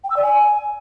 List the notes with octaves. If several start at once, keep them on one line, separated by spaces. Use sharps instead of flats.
G5
E6
D5
G#5